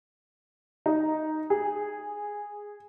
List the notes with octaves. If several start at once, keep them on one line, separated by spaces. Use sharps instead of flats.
D#4
G#4